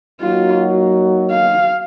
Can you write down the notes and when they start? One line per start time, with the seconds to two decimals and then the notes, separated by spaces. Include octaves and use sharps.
0.21 F#3 A#3 D#4 F4 F#4
1.31 F5